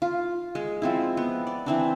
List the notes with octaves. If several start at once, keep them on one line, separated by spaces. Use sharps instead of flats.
F4
G#3
F3 C4 E4
B3
D5
E3 C4 D4